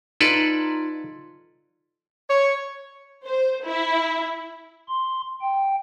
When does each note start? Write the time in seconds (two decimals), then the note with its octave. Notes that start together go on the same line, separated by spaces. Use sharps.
0.21 D#4 F4 A4 B4 D5
2.29 C#5
3.25 C5
3.65 E4
4.89 C6
5.41 G5